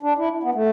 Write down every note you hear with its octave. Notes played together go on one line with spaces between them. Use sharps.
D4
E4
B3
A3